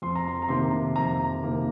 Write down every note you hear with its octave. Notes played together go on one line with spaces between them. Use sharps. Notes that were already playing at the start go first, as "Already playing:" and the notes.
F2 C6
A#5
C6
A#5
C3 D#3 A#3 C6
F2 A#5
C3 D#3 A#3